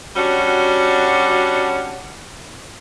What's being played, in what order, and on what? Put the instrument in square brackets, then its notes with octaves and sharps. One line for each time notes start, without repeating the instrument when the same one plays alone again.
[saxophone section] G3 C#4 D4 F#4